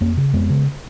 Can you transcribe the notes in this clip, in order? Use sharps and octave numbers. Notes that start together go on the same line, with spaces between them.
F2 A#3 C#4
C#3
F2 G#3 B3
C#3